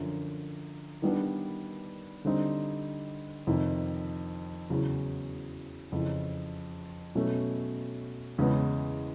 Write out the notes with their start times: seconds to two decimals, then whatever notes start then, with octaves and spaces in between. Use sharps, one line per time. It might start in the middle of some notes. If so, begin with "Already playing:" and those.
Already playing: F#2 D3 F3
1.02 D#3 G3 B3 D4
2.25 D3 G3 C4 D#4
3.47 F2 C3 D#3
4.70 E2 C#3 F#3
5.92 F2 C#3 E3
7.15 B2 F#3 A3 C#4
8.38 E2 C#3 E3 G#3 B3